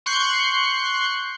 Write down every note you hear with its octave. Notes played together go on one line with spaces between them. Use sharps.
C6 C#6 F#6 G6 C7 C#7